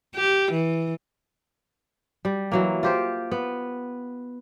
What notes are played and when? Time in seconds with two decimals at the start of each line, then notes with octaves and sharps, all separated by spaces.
0.16 G4
0.52 E3
2.25 G3
2.52 E3 F#3 A#3
2.83 F4 G4 C5
3.32 B3